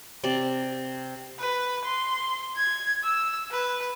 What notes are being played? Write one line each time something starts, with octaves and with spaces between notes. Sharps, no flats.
C3 D5
B4
C6
G#6
E6
B4